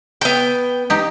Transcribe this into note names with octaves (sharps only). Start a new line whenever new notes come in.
B3 G5
D#4 G4